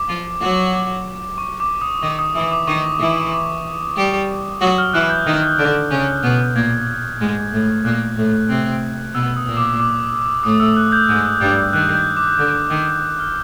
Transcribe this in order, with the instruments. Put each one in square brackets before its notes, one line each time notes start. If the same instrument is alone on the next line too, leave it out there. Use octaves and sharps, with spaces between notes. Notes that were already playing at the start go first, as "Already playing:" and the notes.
Already playing: [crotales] D6
[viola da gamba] F3 F4
F#3 F#4
[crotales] D6
C#6
D6
D#6
[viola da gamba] D#3 D#4 [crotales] D6
[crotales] D#6
[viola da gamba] E3 E4 [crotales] D#6
[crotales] D6
[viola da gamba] D#3 D#4 [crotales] C#6
[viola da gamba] E3 E4
[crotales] D6
[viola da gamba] G3 G4
[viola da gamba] F#3 F#4 [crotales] D#6
[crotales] F6
[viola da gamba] E3 E4 [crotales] F#6
[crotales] G6
[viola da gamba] D#3 D#4
D3 D4
C#3 C#4
B2 B3
[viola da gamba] A#2 A#3 [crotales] G#6
[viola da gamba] G#2 G#3
A2 A3
[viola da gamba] A#2 A#3 [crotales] F#6
[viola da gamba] A2 A3
C3 C4
[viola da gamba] B2 B3 [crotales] E6
[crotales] D#6
[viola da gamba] A#2 A#3
[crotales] D6
D6
[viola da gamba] A2 A3 [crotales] D#6
[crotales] E6
F#6
G6
[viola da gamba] G#2 G#3 [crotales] G6
[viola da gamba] G2 G3
[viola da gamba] D#3 [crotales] F#6
[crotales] G6
D6
[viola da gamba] D3
D#3
[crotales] F6